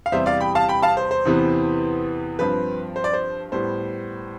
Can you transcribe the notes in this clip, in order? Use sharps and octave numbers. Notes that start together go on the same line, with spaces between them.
F5
E2 C3 G3 C5 E5
D5 F5
G5 B5
F5 A5
G5 B5
F5 A5
C5
C5
E2 C3 E3 B3
G2 F3 C4 B4
C5
D5
C5
A2 G3 B3 C5